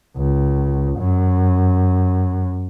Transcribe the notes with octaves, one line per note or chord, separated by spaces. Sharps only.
C#2
F#2